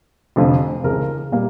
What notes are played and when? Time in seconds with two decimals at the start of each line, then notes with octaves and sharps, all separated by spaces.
0.36 F1 F2 D3 F3
0.84 C#2 C#3 E3 A#4
1.32 A#2 G3 A#3